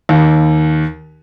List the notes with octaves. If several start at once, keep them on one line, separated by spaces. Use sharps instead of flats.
D#2